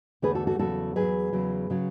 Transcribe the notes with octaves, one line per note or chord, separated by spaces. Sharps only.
E2 D3 A3 G#4 B4
F#4 A4
F#4 A4
E2 C#3 F#3 F#4 A4
E2 C#3 F#3 G#4 B4
E2 C#3 F#3
C#3 F#3